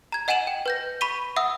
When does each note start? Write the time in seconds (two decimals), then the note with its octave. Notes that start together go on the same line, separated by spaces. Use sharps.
0.12 A#5 G#6
0.28 D#5 F#5 G#5 D#7 E7 F#7
0.47 G5
0.66 B4 G6 A#6
1.01 B5 C#6 B6 D#7 G7
1.36 E5 F#5 D#6 E6